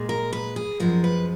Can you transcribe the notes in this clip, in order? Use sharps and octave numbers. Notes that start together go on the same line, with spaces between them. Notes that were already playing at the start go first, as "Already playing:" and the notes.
Already playing: A#2 G#3
A#4
B4
G#4
F#2 F3 G#3 A#4
B4